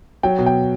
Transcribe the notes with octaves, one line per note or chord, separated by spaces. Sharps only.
F#3 G5
B2
G5